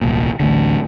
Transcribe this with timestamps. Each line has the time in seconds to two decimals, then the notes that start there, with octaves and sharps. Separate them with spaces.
0.01 D#1 C2 A#2
0.40 A1 D2 D3